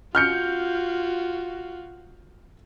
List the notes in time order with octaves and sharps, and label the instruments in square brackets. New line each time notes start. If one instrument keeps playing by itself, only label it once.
[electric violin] F4 F#4 [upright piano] F6 G6 C#7